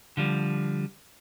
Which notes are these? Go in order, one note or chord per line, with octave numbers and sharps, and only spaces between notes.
D3 F3 G3